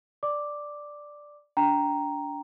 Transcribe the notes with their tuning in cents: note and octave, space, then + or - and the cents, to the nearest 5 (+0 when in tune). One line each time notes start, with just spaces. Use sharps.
D5 +0 D6 +0
D4 -30 G5 +0 A#5 +0